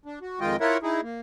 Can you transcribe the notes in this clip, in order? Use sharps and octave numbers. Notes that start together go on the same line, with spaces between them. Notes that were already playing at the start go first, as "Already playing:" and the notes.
D4
F#4
F2 D#3 G#3 F4 D#5 G5
E4 F4 A#4 C#5 E5 F#5
D#4 E4 G#4
A#3